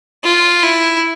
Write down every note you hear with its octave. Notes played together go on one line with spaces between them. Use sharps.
F4
E4